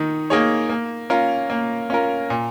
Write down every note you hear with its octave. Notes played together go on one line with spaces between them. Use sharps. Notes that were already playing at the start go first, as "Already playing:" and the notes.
Already playing: D#3 D#4
A#3 D#4 G#4 C#5
A#3
C#4 F4 A#4
A#3
C#4 F4 A#4
A#2